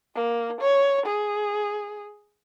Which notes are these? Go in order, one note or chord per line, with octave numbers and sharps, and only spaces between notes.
A#3
C#5
G#4